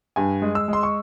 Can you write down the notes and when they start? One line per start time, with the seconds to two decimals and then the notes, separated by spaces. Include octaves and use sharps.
0.16 G2 G#5
0.42 G#3
0.55 E6
0.68 G#3 C6
0.83 C#6